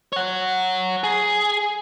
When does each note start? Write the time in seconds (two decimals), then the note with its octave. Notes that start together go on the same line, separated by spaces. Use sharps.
0.13 C#5 F#5
1.04 G#4